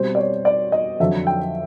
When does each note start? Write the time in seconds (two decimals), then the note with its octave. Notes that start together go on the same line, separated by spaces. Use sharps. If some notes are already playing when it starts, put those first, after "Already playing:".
Already playing: B2 G3 C4 C5
0.15 D5
0.18 C#5
0.45 D5
0.72 D#5
1.00 F2 D3 F#3 E5
1.27 G5